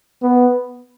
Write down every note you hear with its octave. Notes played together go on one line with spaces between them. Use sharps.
B3